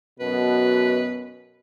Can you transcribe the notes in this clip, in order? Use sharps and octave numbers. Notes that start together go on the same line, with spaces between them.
F#2 B2 B4